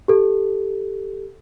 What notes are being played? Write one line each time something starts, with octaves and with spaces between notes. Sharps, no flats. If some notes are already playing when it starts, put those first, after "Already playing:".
G4 A4